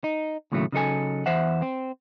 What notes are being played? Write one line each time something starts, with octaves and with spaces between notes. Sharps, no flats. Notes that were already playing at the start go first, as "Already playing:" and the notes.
D#4
D#2 A2 C#3 F#3 G3 A3
C#3 F#3 D#4 A4 G#5
E2 E3 C5 E5 F#5
C4